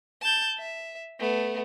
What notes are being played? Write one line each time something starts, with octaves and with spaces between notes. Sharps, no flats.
A5 G6
E5
A3 B3